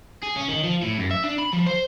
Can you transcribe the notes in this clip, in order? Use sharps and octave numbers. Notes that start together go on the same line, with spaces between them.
G#4
C#4
D#3
F3
A2
F#2
E5
D4
B5
F3
C5